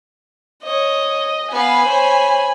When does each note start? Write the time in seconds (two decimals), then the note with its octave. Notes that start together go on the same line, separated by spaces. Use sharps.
0.63 C#5 D#5
1.52 B3 F5 G#5 B5
1.85 C5 C#5